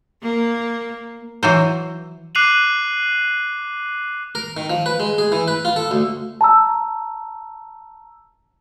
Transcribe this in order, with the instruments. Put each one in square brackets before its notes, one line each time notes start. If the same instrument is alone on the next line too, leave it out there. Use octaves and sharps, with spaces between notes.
[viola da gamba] A#3
[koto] E3 F#3 C5
[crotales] D6 F#6 C7 D#7 F7 F#7
[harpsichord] A#4
D#3
F3
B4
G#3
G#4
E3
B4
F4
A4
D2
[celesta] A5 A#5 E6